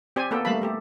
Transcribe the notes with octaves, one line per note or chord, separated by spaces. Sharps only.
C4 G4 C5 D5 G#5
A#3 B3 A4 B4 G5
G3 A3 A#3 F5 A5 B5
A3 G4 A4